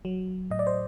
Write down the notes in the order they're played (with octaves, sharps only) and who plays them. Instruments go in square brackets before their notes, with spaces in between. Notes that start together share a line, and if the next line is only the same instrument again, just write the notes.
[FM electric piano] F#3
A2 D#5
D5
C5